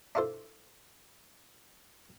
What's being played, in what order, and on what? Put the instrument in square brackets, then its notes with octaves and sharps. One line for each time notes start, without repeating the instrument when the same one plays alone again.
[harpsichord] D4 E4 F4 A4 C5